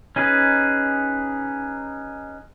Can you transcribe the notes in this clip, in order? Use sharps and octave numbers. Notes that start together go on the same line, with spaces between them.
C#4 D#4 G#4 B4